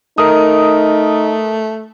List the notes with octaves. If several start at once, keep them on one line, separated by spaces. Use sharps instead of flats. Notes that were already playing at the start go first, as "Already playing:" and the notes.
A3 D#4 A#4 D#6